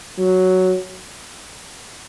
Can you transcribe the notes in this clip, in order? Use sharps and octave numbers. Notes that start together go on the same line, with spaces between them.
F#3